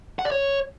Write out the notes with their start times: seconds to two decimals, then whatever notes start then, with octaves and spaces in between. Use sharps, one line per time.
0.19 F#5
0.25 D5
0.32 C#5